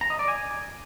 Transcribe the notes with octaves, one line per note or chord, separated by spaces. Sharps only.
A#5
D#5
D5
G#5